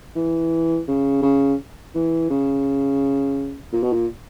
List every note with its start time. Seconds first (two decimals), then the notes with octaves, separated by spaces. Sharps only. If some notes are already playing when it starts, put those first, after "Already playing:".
0.16 E3
0.88 C#3
1.22 C#3
1.95 E3
2.30 C#3
3.73 A#2
3.83 B2
3.92 A#2